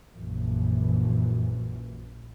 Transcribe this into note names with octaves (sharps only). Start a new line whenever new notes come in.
A#1 F#2 E3